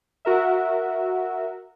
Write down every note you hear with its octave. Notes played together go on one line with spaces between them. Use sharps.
F#4 A#4 E5